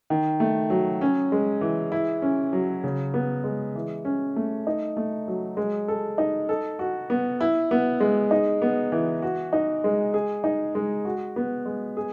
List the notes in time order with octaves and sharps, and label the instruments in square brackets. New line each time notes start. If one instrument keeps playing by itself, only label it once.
[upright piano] D#3
A3
F#3
C#4
G#3
E3
E4
C#4
F#3
C#3
B3
G#3
E3
C#4
A3
D#4
A3
F#3
G#3
A4
D#4
A4
F#4
B3
E4
B3
G#3
D#4
B3
E3
F#4
D#4
G#3
G#4
D#4
G#3
F#4
B3
G#3
G#4